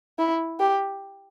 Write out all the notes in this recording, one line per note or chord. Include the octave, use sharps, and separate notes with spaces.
E4
G4